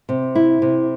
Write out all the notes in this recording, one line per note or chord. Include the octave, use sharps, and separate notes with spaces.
C3
E4
C3